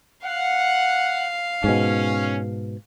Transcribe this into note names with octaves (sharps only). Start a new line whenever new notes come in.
F5 F#5
G#2 B2 C#4